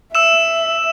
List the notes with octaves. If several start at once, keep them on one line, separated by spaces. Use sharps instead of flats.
E5 E6 E7